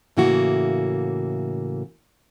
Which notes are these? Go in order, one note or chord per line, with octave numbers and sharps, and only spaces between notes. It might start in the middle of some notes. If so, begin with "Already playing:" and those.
A2 C#3 E3 A#3 F#4